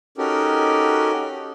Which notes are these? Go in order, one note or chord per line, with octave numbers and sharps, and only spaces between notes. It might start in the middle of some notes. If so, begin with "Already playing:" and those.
C#4 D#4 F#4 G4 A4 A#4